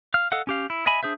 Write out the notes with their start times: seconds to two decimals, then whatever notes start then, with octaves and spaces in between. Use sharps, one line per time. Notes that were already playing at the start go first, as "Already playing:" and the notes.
0.14 F5 F6
0.32 A4 D#5 F5 F#5
0.47 C#4 G4 F5
0.70 E4
0.86 D#5 E5 G#5 B5
1.03 D4 G#4 C5 E5